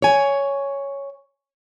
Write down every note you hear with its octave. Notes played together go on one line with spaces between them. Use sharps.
C#5 G#5